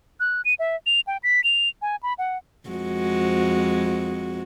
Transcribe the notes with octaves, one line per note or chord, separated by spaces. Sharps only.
F#6
D#7
E5
F7
G5
B6
F7
G#5
B5
F#5
F2 G#3 F#4